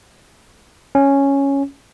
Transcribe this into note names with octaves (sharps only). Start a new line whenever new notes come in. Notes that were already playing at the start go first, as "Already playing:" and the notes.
C#4